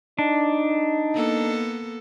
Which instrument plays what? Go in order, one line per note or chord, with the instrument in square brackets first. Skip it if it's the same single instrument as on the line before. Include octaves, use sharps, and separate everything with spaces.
[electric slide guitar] D4 [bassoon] D#4
[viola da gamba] A#3 B3 A4